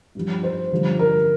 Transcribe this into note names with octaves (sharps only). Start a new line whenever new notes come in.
G2 F3
C5
G2 D3 F3
A#4